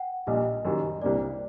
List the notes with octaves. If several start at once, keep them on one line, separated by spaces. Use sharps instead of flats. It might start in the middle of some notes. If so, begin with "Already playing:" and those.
Already playing: F#5 G5
A#1 A#2 G3 D#5
F#1 F#2 D#3 G3
C2 C3 G3 A#3 D4 D5